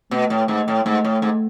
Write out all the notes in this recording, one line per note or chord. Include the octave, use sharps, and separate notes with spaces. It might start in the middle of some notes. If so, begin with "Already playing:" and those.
B2 A3
A2
G#2
A2
G#2 A3
A2
G#2